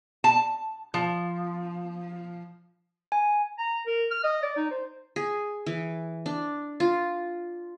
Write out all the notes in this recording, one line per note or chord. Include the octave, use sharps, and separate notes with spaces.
A5
F3
G#5
A#5
A#4
F6
D#5
D5
D#4
C5
G#4
E3
D4
F4